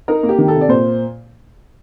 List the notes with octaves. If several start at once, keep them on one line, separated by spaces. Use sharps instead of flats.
D#4 A#4
A#3
G4
D#3
A4
C3
D5
A#2 C5